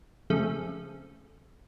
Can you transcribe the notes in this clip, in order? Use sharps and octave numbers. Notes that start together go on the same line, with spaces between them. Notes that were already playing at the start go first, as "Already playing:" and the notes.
F2 C#3 A3